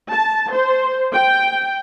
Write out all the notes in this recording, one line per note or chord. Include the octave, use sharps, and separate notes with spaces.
A5
C5
G5